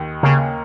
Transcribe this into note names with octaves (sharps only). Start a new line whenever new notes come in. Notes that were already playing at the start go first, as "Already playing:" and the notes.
Already playing: D#2 D#3
C#3 A#3